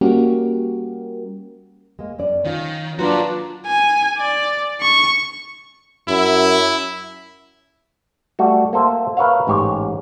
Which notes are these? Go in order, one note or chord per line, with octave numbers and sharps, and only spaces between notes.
G3 A#3 C#4 F#4 G4 A#4
G#3 A#3
F#2 C#4 D5
D#3 C#4 F4
F#3 A#3 D4 F4 F#4 A#4 B4 A#5
G#5
D5
C#6
F#2 E4
G3 A3 F#4
A#3 A4 C5 E5
A#4 B4 C#5 E5 F5
A1 G#2 G4 C#5